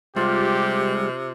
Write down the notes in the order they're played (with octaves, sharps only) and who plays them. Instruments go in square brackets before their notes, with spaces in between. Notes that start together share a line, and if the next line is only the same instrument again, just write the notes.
[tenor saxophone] C3 [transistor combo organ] G3 G#3 [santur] F4 F5 [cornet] G4